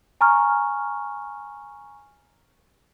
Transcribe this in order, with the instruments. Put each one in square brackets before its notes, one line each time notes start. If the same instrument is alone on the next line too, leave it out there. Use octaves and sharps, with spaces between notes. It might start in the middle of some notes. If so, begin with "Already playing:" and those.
[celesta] G#5 A#5 C#6 F6